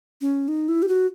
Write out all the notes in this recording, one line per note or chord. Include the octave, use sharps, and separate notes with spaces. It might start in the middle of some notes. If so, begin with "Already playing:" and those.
C#4
D#4
E4
G4
F#4